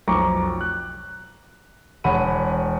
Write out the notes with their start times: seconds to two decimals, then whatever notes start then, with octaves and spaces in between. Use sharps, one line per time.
0.08 B1 F2 A#5 C#6 D6
0.61 F#6
2.04 E1 C#5 F#5 B5 D#7